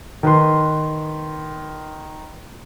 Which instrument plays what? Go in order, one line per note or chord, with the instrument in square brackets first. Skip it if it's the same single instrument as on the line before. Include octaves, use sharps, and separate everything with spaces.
[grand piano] D#3 B4 C6